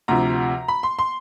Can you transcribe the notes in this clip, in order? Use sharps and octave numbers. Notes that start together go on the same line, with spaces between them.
D2 C3 F3 A#5
B5
C6
C6